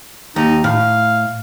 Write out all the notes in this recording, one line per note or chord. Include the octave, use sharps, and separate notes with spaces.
D#2 D#4
A2 F5